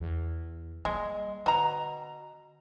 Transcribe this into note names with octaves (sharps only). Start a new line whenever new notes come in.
E2
G3 G#3 A#3
B2 D3 A#5